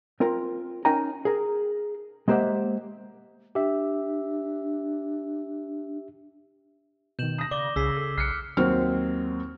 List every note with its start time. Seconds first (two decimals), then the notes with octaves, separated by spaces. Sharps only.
0.20 C4 F4 A#4
0.85 C#4 D#4 A#4 G5 G#5 A#5
1.25 G#4 A#4
2.28 G#3 A#3 G4 C5 E5 F#5
3.55 D4 G4 E5
7.19 B2 D#3 G6 E7 F#7
7.38 D4 D#6 A#6
7.51 C#3 D5 D6 G7
7.76 C2 C#3 G#4 E6 B6 C7
7.97 A4
8.18 B1 F6 F#6 C7 C#7
8.57 D#2 F#3 C4 F6